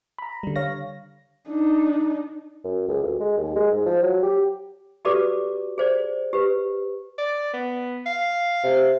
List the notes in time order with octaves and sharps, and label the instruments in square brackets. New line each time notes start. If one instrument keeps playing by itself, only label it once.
[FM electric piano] A#5 B5
D3 G3
C#5 F5 A#6
[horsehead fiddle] D4 D#4
[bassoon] F#2
C#2
D2
G#3
D#2
G#3
G#2
F3
F#3
G4
[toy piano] F#4 G4 A4 B4 D5 D6
G#4 C5 D5
G4 B4
[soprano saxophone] D5
B3
F5
[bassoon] C3